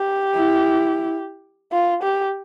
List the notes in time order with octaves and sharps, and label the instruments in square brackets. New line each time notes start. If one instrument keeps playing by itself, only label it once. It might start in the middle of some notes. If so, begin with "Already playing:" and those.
Already playing: [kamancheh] G4
[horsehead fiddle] E4
[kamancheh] F4
G4